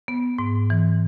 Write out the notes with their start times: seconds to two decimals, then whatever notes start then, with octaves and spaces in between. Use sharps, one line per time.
0.08 B3
0.38 G#2
0.70 E3